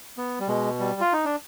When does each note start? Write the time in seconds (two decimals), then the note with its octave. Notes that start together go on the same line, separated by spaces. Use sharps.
0.17 B3
0.40 G3
0.48 B2 G#3
0.80 G3
1.01 F4
1.13 D#4
1.25 D4